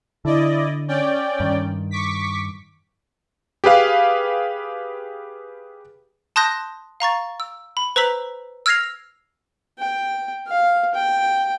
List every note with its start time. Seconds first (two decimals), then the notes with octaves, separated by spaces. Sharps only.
0.25 D3 E4 D5 D#5
0.88 C#4 D5 G5
1.40 G2 D#3
1.91 C#6 D6 B6
3.64 G4 G#4 B4 F5
6.36 A5 C6 D#6 F#6 G6 A#6
7.00 F5 A#5 C#6 A6
7.40 E6
7.77 B5
7.96 B4 C5 A#5 E6 B6 F#7
8.66 E6 F6 G#6 A#6 C7 F7
9.79 G5
10.47 F5
10.94 G5